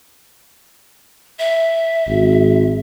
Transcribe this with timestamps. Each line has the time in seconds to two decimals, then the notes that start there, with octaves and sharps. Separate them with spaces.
1.39 E5
2.07 G#1